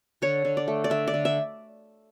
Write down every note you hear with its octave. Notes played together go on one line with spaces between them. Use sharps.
D3 C#5
D3
D5
A3
D5
D3 E5
D5
D3
E5